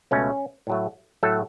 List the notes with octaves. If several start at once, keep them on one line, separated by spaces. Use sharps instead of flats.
C#2 B2 A3 C#4
A2 F#3 A3
A2 F#3 A3 A4